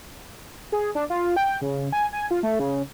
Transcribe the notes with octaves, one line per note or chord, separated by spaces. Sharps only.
G#4
D4
F4
G5
C#3
G#5
G#5
F4
A3
C#3